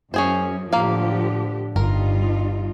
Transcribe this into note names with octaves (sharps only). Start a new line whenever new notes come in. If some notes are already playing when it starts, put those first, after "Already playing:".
F#2 C#4 G#4 C5
A2 D3 F3 A#3 G4 F5
G1 G2 G3 D#4 F4 A#4